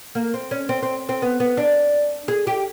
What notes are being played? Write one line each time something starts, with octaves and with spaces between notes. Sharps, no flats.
A#3
C4
C#4
C4
C4
C4
B3
B3
D4
G#4
G4